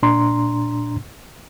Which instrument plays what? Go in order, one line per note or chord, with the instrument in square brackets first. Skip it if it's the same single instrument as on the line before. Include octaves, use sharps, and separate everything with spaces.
[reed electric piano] A#2 D4 A#5 C6